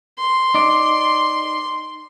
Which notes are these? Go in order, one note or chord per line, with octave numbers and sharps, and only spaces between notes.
C6
D#4 D5